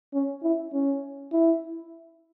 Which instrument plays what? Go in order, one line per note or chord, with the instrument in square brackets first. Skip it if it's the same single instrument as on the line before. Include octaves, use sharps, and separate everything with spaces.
[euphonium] C#4
E4
C#4
E4